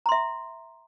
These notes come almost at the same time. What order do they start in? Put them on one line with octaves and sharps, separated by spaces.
A#5 C6 E5